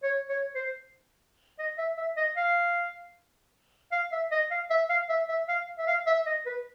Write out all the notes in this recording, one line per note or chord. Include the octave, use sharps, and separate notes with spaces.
C#5
C#5
C5
D#5
E5
E5
D#5
F5
F5
E5
D#5
F5
E5
F5
E5
E5
F5
E5
F5
E5
D#5
B4